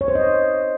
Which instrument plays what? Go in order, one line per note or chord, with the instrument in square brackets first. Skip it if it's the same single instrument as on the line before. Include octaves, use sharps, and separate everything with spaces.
[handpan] C#5
C5
D#5